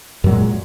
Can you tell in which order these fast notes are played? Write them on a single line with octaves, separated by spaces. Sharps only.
F#2 F#3 A#2 G#3